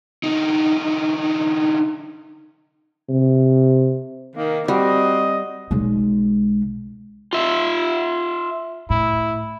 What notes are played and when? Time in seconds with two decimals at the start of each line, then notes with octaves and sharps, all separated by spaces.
0.23 D3 D#4
3.09 C3
4.35 D#3 A#3
4.68 G3 C4 F#4 D#5
5.71 B1 G#3
7.33 F4 E5
8.90 A2 E4